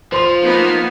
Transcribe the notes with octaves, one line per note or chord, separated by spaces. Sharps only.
F3 C5 C6 F7
A#3 B3 D#4